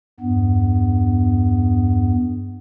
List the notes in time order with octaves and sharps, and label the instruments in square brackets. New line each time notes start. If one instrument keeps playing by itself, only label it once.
[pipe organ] E2 G2 B3